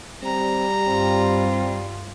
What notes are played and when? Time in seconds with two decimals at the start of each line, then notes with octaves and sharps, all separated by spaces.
0.23 G3 C4 A#5
0.88 G2 C4 F4